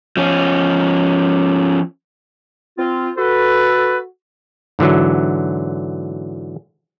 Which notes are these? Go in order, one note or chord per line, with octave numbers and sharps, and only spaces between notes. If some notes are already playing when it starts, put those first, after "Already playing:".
F3 C#4
C4 F4
F#4 A4 B4
G#2 D3 E3 F#3